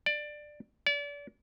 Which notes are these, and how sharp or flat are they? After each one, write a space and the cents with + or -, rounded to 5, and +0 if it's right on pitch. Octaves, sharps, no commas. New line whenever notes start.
D5 +15
D5 -35